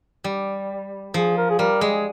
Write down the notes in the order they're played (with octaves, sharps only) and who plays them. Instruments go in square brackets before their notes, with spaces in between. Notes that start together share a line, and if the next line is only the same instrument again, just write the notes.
[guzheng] G3
[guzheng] F3 [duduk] G#4
[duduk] A#4
G#4
[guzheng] G3 [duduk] A#4
[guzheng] G#3 [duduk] G#4